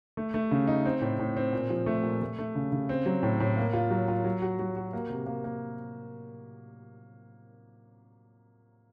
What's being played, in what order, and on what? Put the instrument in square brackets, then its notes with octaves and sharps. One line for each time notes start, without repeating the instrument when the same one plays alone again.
[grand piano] A3
A3
C#3
D#4
C4
A2
A2
C4
A#2
F3
A3
A#2
A3
A3
C#3
C#3
C4
F#3
A2
A2
A#3
F4
F#3
F4
F#3
F#4
F#3
F#4
A#3
C3
A#3
A#3